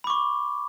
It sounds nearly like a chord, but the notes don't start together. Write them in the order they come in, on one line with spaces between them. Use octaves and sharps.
B5 D6 C#6